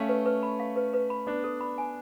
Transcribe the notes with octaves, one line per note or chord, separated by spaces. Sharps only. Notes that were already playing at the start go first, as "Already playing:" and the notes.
Already playing: A3 C#4 F5
B4
B4
B5
F5
B4
B4
B5
B3 D4 D5
A4
B5
G#5